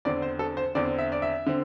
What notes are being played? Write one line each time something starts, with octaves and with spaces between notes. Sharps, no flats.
E2 D3 C4 D5
C5
A4
C5
E2 D3 C4 D5
E5
D5
E5
D3 C4